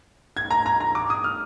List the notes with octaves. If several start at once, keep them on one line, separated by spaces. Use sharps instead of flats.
G#6
A#5
A#5
A#5
D6
D#6
F6